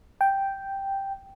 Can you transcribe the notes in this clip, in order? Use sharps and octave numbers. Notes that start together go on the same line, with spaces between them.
G5